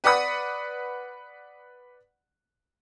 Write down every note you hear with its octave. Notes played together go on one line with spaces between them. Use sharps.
B4 D5 F#5 B5 D#6